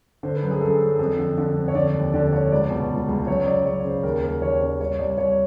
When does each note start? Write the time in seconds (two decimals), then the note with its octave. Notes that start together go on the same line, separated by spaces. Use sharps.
0.23 D3 C5
0.36 B4
0.43 F#2
0.51 G#4
0.61 F#2 A4
0.80 F#2
0.99 F2 A4
1.18 D3
1.38 D3
1.56 F2
1.68 C#5
1.75 D3 D5
1.94 D#2
2.13 D3 D5
2.27 D5
2.32 D3 C#5
2.52 C#2 D5
2.70 B2
2.89 C#2
3.08 C#2
3.27 F#2 C#5
3.46 C#3 D5
3.65 F#2 C#5
3.84 C#3 C5
4.03 D#2 A#4
4.23 D#2 A#4
4.42 D#2 C#5
4.61 C#3 C#5
4.80 C2 C#5
4.98 C2 D5
5.18 C2 C#5